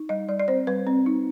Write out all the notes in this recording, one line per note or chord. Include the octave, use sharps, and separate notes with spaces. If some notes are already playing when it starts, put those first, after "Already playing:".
Already playing: D#4
G3 D#5
G3 D5
D5
C4 C5
G3 B4
C4
D#4